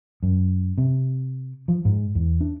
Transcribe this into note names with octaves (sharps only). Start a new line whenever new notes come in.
F#2
C3
F3
G#2
E2
D4